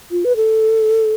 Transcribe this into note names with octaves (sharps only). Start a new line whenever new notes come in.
F4
B4
A4